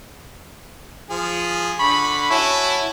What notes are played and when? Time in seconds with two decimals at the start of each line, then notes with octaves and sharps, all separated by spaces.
1.10 F3 G#4
1.80 D3 B5 C#6
2.31 C#4 E4 F#4 A5